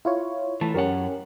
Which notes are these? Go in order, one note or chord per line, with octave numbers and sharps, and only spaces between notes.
E4 F4 C#5
E3 A3 A5
F#2 C#4 G4 A#4 F#5